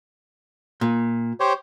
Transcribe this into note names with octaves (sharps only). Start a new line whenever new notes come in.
A#2
G4 C5 C#5